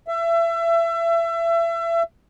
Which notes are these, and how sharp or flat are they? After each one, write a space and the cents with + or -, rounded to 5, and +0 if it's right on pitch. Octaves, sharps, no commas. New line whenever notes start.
E5 +30